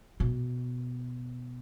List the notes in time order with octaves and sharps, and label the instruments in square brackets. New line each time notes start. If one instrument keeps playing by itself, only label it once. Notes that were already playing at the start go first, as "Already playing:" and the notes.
[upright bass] B2